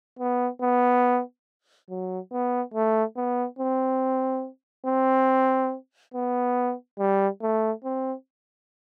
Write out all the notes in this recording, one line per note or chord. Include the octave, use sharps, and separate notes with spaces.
B3
B3
F#3
B3
A3
B3
C4
C4
B3
G3
A3
C4